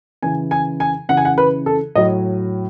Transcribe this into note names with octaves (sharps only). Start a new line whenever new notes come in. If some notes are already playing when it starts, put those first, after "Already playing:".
C#3 E3 G#5
G#5
G#5
C#3 E3 F#5
G#5
F#5
B4
A4
A2 F#3 D#5